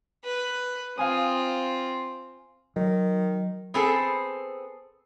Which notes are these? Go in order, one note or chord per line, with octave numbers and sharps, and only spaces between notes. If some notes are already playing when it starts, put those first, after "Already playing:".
B4
C4 F4 F5 G#5 D#6
D#3 F#3
B3 C4 G#4 A4